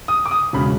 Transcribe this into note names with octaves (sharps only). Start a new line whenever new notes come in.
D#6
D6
D#6
E1 C#3 B5